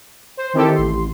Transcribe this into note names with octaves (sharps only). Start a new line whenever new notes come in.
C5
D#3 C4 E4 G4 A4
A1 C6